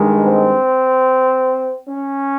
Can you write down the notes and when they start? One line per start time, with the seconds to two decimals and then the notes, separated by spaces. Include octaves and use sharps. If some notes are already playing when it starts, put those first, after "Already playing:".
Already playing: G2 D#3 G#3
0.25 C4
1.87 C#4